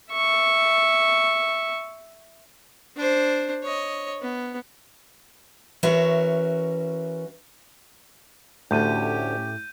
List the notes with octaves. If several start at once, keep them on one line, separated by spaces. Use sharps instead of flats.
E5 C#6
D4 C5
C#5 D#5
B3
E3 C#4 F#4 A#4 E5
D2 A2 C#4 G4 A4 G6 D#7